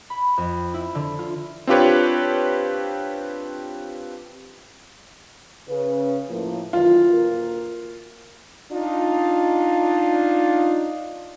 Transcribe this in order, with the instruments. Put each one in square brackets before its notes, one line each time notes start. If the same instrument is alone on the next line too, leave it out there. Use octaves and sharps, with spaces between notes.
[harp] B5
F2
E4
D3
F4
[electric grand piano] C4 D4 F4 G4 B4 C#5
[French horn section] C#3 B4
A2 F3 A#3
[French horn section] D#3 E3 F#3 [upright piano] F4
[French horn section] D2 A#2 A#4
D4 D#4 F4